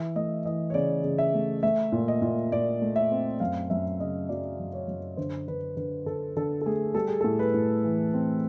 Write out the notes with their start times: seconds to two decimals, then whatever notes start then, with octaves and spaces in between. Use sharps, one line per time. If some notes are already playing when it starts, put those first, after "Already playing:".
Already playing: E3 E5
0.16 A3 D#5
0.45 E3 D#5
0.70 C#5
0.74 C#3 D5
1.04 C#3
1.18 E5
1.34 A3
1.63 A3 E5
1.92 A#2
2.08 D#5
2.22 A#2
2.52 A#2 D5
2.82 A3
2.96 E5
3.12 C4
3.40 F#2 F5
3.70 F#2 E5
4.00 C#3 D#5
4.29 F#3 D5
4.59 F#2
4.73 C#5
4.88 F#2
5.17 D3 C5
5.48 D3 B4
5.77 D3 B4
6.06 D3 A4
6.37 D3 A4
6.61 A4
6.66 A3 G#4
6.95 G3 A4
7.08 G#4
7.21 A2 A4
7.39 B4
7.54 A2
7.84 E3
8.14 C4